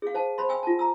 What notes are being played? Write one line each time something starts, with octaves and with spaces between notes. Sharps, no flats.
G#4 F5
C5 F5 A5
C5 B5 C6
G5 G#5 E6
F4 A5
A#5 E6